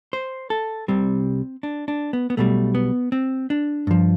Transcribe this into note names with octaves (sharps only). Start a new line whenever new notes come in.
C5
A4
C2 C3 G3 C4
D4
D4
B3
B3
B1 B2 G3 A3
B3
C4
D4
G2 F3